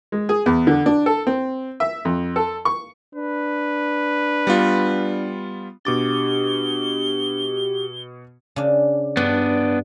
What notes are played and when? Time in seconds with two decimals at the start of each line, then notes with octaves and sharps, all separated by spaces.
0.12 G#3
0.29 G#4
0.46 E2
0.67 D3
0.86 D4
1.06 A4
1.27 C4
1.80 E5
2.05 F2
2.36 A4
2.65 C#6
3.15 D4 B4
4.47 G3 B3 F4
5.85 B2 D4 G4 D6 A6 G7
8.56 C#3 D4
9.17 G2 B3 D4